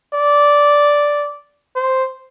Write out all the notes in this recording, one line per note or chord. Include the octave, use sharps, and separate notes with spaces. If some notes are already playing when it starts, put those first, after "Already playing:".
D5
C5